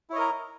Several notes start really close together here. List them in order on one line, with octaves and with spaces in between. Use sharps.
E4 C#5 D#5 A#4 A#5